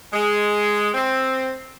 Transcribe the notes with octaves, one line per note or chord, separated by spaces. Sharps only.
G#3
C4